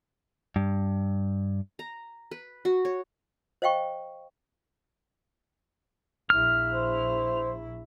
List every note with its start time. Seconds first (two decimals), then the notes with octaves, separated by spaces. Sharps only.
0.56 G2
1.79 A#5
2.31 B4
2.65 F#4
2.85 C#5
3.62 C5 D#5 F5 G5 C#6
6.30 A#1 E4 F6
6.71 C5